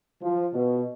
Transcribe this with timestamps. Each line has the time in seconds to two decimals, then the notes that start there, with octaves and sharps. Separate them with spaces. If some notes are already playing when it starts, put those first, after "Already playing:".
0.22 F3
0.54 B2